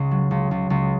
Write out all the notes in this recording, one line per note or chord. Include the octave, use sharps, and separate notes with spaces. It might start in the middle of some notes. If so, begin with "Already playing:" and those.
Already playing: C#2 C#3
F#3
C#2
C#2
C#2